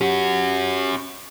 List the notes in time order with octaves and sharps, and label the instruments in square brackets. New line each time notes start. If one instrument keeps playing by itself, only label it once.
[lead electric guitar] C#4 F#4 [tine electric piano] G4